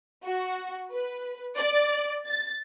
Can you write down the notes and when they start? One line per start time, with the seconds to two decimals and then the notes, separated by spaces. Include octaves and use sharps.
0.24 F#4
0.91 B4
1.57 D5
2.26 A6